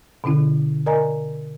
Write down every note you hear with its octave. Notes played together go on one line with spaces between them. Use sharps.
B2 D3 C#4 E4
A#4 D5 D#5 G#5 A#5